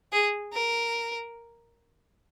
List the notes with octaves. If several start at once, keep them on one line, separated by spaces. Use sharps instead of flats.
G#4
A#4